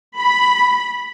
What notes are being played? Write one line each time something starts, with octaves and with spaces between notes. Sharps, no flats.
B5